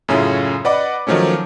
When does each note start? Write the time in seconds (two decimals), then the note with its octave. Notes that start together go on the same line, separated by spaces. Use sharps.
0.08 F#2 A2 C#3 C#4 E4 F4
0.65 B4 D5 D#5 F#5 B5 D6
1.07 D#3 F3 F#3 A3 C#4